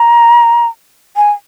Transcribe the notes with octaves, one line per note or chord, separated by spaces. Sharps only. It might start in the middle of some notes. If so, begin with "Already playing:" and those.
Already playing: A#5
G#5